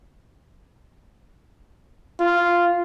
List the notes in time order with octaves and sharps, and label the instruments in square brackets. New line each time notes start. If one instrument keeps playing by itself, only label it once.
[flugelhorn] F4